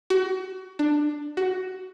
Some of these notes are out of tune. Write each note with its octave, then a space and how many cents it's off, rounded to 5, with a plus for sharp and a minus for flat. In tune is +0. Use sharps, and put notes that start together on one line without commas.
F#4 +30
D4 +15
F#4 +15